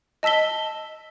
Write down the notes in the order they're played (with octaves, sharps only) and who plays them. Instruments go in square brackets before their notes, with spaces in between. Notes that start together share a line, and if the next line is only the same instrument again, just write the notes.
[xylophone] D#5 A5 E6 B6 G7